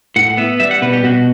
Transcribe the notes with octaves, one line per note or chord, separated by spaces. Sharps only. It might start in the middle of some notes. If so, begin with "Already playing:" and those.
A2 F#5
B3 E5
G3 E5
F#5
B2 B4
G4
B2 F#4